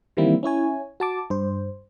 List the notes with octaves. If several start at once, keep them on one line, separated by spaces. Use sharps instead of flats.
D#3 E3 G3 A#3 C4 E4
C#4 E4 C#5 G#5
F#4 A5 D6
G2 C5